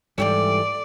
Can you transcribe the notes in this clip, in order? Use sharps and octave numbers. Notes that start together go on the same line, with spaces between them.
G#2 E3 G3 G4 A4 D5